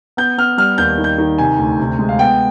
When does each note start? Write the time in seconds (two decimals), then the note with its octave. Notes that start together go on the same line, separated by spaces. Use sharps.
0.17 B3 G6
0.38 B3 F6
0.58 G3 F6
0.78 D#2 G6
0.98 D#3
1.04 G6
1.18 D#3
1.38 C3 G#5
1.59 D2
1.79 C3
1.99 G#3
2.09 F5
2.19 B3 G5